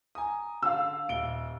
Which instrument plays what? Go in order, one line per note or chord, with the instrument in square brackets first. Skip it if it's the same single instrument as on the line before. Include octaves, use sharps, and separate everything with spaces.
[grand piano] G#5 A#5 D#6
[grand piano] D3 [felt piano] F5 E6
[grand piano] D#1 D7 G7